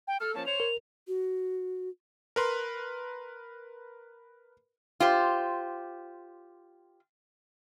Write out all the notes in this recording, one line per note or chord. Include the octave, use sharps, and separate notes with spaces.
G5
A4 F6
F3 A#3 C#4 A5
C5 C#5 F7
A#4
F#4
A#4 B4 C6
F4 G4 C5